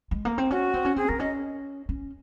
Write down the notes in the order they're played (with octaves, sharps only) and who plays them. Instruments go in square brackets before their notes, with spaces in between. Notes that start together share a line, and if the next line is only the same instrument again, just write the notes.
[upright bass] G#3
A#3
C4
[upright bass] C#4 [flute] F#4
[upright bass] C4
C#4
[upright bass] C4 [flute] G#4
[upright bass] C4 [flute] A#4
[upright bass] C#4 [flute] D#5
[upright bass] C#4